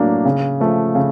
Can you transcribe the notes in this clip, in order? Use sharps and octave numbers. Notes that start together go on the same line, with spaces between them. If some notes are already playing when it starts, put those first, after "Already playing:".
Already playing: A2 F#3 A#3 D4
C#3
F3 A3
C#3